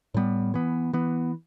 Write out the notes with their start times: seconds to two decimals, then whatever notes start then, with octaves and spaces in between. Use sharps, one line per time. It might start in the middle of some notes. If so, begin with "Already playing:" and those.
0.14 A2 G3 B3
0.54 E3 B3
0.93 E3 B3